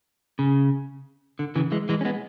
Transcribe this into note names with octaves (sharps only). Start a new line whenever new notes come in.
C#3
D3
C#3 E3
E3 G#3
E3 G#3
C#4
G#3 B3